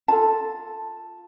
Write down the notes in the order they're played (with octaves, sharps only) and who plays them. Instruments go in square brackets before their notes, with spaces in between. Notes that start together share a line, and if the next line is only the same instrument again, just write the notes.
[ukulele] F4 A4 A5